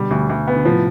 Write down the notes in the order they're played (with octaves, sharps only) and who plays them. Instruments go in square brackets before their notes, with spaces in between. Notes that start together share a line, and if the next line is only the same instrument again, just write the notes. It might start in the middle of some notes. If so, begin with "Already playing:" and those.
Already playing: [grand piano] B2 D3 [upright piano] G3
[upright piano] D2
D2
B3
[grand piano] D3
[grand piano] A2 C3 [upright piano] F3